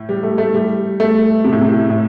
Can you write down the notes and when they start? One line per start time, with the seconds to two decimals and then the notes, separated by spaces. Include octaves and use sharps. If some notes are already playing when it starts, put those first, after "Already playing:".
Already playing: A2
0.09 G3
0.23 A3
0.38 A3
0.54 G3
1.00 A3
1.44 C3
1.52 A2
1.61 C3
1.90 A2